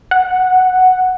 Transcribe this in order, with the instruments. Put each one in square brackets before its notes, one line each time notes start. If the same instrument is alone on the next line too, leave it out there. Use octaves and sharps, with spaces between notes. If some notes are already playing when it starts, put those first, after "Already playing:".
[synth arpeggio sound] F#5